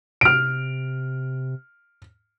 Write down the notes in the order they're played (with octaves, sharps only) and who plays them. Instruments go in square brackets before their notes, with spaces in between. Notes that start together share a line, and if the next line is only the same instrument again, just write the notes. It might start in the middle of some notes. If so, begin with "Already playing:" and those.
[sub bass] C3 [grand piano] F6 D7